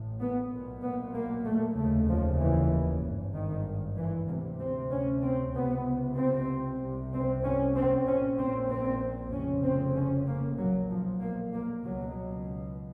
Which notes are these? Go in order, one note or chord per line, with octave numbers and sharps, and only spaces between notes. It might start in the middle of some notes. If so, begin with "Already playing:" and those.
Already playing: A1 A2
B3
B1 A#2
B3
A#3
A3
F1 D#2 C#3 A3
F3
E3
G#1 G2
D#3
E3
D2 A#3
C3
C4
C#4
C4
C#2 C3 B3
C4
C2 C3
C4
C#4
C4
A#1 A#2 C#4
C4
C4
F1 F2 C#3 C#4
C4
C#4
A#3
B1 A#2 F#3
F3
A#3
A#3
C#2 B2 F#3